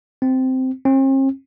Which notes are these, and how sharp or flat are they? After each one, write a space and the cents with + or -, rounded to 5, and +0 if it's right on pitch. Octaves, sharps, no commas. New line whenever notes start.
C4 -10
C4 +45